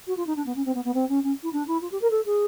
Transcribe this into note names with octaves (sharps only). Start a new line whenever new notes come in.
F#4
F4
D#4
D4
B3
C#4
C4
B3
B3
C4
C#4
C#4
E4
D4
E4
F4
G4
A#4
A4
G#4